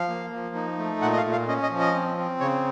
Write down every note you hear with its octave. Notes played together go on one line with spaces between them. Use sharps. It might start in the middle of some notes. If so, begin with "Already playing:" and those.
Already playing: F3 F5
A#3
F3
D#4
A3
A#2 F#5
D#5
F5
A#2
F5
C#4 D#5
D#5
F3
D#5
C4
C4
C#3 C#5